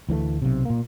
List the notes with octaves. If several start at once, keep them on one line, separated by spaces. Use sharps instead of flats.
D2 E3 F#3 A3
B1 C3
A#2 A#3